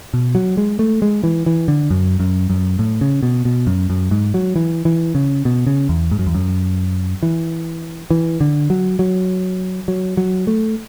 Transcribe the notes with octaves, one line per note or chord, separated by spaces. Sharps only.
B2
F#3
G#3
A3
G#3
E3
E3
D3
F#2
F#2
F#2
A2
C#3
B2
B2
F#2
F#2
G#2
F#3
E3
E3
C#3
B2
C#3
E2
G#2
F#2
E2
F#2
E3
E3
D3
F#3
F#3
F#3
F#3
A3